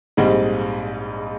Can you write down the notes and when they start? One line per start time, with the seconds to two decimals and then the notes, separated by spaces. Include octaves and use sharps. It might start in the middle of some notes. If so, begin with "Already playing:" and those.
0.17 A#1 G#2 G3 C4 D#4